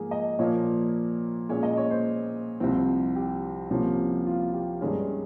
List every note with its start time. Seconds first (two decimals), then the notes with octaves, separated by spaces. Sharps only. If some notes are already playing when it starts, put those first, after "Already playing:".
Already playing: G#2 F3 A#3 G#4
0.11 D#5
0.39 A#2 F3 A#3 C#5
1.49 A#2 G#3 C#4 C#5
1.63 D#5
1.77 C#5
1.90 C5
2.60 C2 C3 F3 C4
3.16 G4
3.70 C2 C3 F3 A#3 C#4
4.26 F4
4.54 G4
4.81 G2 D#3 G#3 C#4